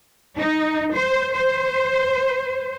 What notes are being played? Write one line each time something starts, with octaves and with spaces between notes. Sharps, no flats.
D#4
C5
C5